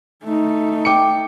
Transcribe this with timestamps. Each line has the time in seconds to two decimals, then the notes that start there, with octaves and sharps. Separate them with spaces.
0.24 A3 D#4
0.85 G5 D6 C#7